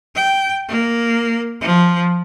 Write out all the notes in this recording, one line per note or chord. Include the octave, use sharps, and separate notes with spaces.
G5
A#3
F3